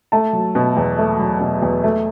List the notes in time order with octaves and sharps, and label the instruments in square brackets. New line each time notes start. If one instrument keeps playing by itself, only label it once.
[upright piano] A3 A5
F#3
B2
E2
A3
F#3
B2
E2
A3